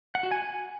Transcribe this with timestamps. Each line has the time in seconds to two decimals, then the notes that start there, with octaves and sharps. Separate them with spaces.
0.15 F#5
0.23 F#4
0.31 G#5